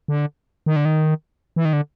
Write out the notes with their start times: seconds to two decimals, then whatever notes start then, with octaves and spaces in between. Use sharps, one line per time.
0.08 D3
0.66 D#3
0.76 D3
0.85 D#3
1.56 E3
1.65 D#3
1.73 D3